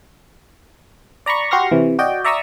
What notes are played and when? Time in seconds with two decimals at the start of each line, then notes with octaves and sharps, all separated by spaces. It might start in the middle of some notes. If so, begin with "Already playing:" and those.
1.26 D5 A#5 B5 C#6
1.51 F#4 G4 C6 C#6 F6 A#6
1.71 C3 E3
1.99 F#4 D5 D#5 G5
2.24 D5 E5 A#5 C#6 D#6 E6